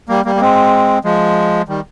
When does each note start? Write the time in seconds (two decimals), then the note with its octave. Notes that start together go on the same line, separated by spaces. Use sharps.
0.09 G3 A#3
0.25 G3 A#3
0.35 A#3
0.41 G#3 C4
1.05 F3 G#3
1.68 D#3 G3